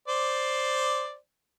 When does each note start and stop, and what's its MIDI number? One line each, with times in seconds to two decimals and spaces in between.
0.08 1.15 72
0.08 1.15 74